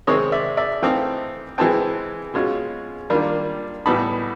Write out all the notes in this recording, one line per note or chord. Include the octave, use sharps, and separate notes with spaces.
C3 D#3 G#3 C4 C#5 D#5
D5 E5
D5 E5
E3 A3 C4 D#4 F5 G5
E3 G#3 C4 G5 A5
B2 G#3 C#4 F4
D#3 G3 A#3 D4 F4
A2 E3 G3 B3 D#4 A5 B5